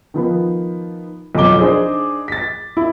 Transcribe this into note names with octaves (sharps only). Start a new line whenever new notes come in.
D#3 F3 B3
B1 F2 F3 D6 G7
D4 D#4 G#4 C5
A6 B6
E4